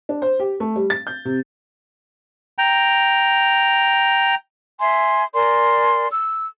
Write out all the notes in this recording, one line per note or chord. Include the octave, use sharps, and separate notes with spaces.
D4
C5
G4
A3
G3
A6
G6
C3
G5 A#5
E5 G#5 C6
A#4 D5 G#5 C6
E6